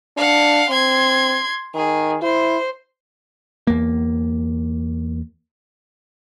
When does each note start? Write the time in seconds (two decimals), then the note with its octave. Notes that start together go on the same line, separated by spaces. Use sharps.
0.17 D4 F5 F#5
0.70 C4 C6 G#6
1.75 D#3 G#4
2.22 E4 C5
3.67 E2 A#3